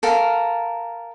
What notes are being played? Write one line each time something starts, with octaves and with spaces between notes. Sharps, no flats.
A4 A#4 F5